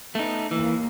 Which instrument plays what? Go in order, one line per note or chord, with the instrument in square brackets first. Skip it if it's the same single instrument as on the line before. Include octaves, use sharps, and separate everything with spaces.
[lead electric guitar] A3 D#4 [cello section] B3
[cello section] D#2 A#3 [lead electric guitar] E3